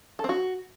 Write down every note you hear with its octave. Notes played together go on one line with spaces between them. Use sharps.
A4
C4
F#4